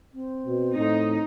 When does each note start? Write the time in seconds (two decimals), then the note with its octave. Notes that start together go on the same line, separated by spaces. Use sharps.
0.13 C4
0.46 B2
0.76 A2 D#4